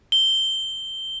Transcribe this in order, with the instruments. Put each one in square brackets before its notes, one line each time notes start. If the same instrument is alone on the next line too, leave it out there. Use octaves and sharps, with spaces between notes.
[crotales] G7